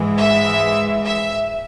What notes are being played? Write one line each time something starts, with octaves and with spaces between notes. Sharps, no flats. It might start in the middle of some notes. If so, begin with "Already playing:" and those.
Already playing: G#2 E3 G#3
E5
E5